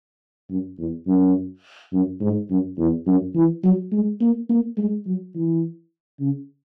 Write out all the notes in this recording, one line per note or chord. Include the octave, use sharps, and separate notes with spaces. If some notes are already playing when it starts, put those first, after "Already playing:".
F#2
E2
F#2
F#2
G#2
F#2
E2
F#2
E3
F#3
G#3
A#3
A#3
G#3
F#3
E3
C#3